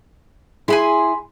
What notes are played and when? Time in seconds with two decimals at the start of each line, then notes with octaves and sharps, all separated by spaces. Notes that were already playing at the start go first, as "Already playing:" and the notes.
0.68 E4 G#4 G#5 B5 C6